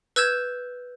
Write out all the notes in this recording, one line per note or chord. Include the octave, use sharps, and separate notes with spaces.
B4 E6 G6 G#6 E7